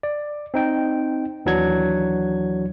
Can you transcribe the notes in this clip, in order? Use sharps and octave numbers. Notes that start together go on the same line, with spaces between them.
D5
C4 D#4 G5
D#2 E3 F#3 D4 F#5 G#6